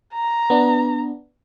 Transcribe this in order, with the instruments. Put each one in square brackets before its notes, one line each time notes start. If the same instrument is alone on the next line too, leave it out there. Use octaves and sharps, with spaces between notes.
[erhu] A#5
[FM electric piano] B3 D4